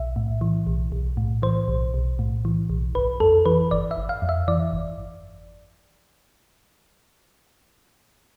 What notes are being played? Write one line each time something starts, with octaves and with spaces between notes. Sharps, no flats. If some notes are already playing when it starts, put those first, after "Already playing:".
Already playing: B1 E5
A2
E3
B1
B1
A2
E3 C5
B1
B1
A2
E3
B1
G1 B4
F2 A4
E3 B4
G1 D5
E5
G1
F5
F2
E5
E3 D5
G1